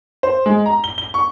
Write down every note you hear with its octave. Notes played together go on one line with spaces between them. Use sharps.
C5
G#3
A#5
G7
G7
C#6